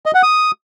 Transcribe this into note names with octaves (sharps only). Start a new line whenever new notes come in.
D#5
F#5
D#6